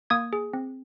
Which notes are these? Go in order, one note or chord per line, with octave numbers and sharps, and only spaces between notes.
A#3 D#6 G#6
G#4
C4